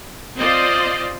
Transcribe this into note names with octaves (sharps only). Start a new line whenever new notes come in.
C4 F4 C5 D5 D#5